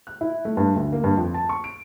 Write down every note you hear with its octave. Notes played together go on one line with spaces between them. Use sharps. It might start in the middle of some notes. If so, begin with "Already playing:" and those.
F#6
E4
A3
G2
D2
A#3
G2
F2
A5
C#6
D7